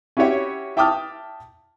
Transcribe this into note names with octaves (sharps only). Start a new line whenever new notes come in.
C#4 E4 F#4 G4 C#5 E5
E5 G5 A5 D6 D#6 F6